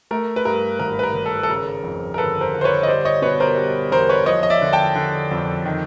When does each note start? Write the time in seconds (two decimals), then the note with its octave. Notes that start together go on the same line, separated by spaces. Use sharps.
0.11 A3 A#4
0.36 B4
0.45 G2 A#4
0.79 G#1 A#4
0.99 B4
1.03 A#4
1.14 G#1
1.26 A4
1.43 A4
1.50 C#3 A#4
1.84 F2
2.14 A#4
2.18 G1 A4 B4
2.41 A#4 C5
2.54 G1
2.61 C5
2.64 B4 C#5
2.83 D#5
2.87 G3 C5 D5
3.05 C#5 D#5
3.22 B2 B4 C#5
3.40 A#4 C5
3.57 G3
3.92 E2 A#4 C5
4.09 B4 C#5
4.26 F3 C#5 D#5
4.43 D#5
4.50 D5 E5
4.62 D3
4.73 G5 A5
4.95 D3
5.31 F2
5.65 D#3